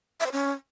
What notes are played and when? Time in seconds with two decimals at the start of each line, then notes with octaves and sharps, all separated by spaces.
0.20 E5
0.26 C5
0.32 C#4